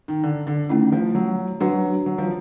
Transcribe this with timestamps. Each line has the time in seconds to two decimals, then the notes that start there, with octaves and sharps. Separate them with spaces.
0.08 D#3
0.23 D3
0.47 D3
0.69 D#3 A3 C#4 E4
0.92 F3
1.15 F#3
1.60 F#3 D4 F#4 B4
2.06 F#3
2.18 F3